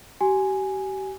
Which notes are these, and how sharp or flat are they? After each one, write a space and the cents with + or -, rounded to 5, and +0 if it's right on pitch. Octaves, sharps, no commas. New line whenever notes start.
G4 -35 G#5 +0